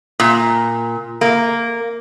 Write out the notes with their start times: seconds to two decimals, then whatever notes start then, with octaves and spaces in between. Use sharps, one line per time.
0.20 A#2
1.21 A#3